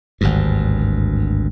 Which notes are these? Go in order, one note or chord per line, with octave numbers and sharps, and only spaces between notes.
G#1 D2 G2